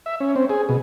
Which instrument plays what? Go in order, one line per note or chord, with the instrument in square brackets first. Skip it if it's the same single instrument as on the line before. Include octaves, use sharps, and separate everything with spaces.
[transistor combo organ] E5
C#4
C4
G#4
B2